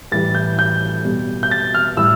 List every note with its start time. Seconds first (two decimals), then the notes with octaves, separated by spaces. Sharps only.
0.12 A2 E3 G3 A6
0.35 G6
0.59 G6
1.05 B2 G3
1.43 G6
1.51 A6
1.74 F6
1.97 A2 G3 E6